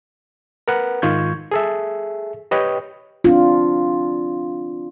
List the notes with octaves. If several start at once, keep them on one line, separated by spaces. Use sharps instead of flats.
A#4 B4 F#5
G#2 D#3 F4 C#6 G6 G#6
G#4 A4 E5
G4 B4 C#5 D#5 G5
C4 D4 F4